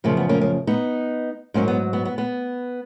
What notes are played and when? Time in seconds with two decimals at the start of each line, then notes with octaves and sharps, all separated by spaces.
0.04 F#2 C#3 F3 A#3
0.17 B3
0.29 A#3 C#4
0.41 A#3
0.67 B3 D#4
1.54 G#2 F#3 A#3 C#4
1.68 B3
1.93 B3
2.05 B3
2.18 B3